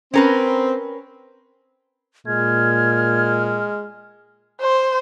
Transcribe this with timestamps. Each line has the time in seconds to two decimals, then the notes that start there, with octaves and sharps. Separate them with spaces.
0.14 C4 C#4 A#4 B4
2.27 A#2 G#3 F6 G#6
4.61 C5